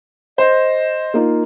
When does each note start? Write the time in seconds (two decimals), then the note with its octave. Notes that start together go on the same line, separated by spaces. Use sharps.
0.38 C5 D#5
1.14 A#3 D#4 F4